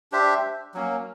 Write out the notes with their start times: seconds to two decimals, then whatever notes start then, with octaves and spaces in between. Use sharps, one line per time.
0.12 D4 G4 C5 E5
0.74 F#3 A#3 C#4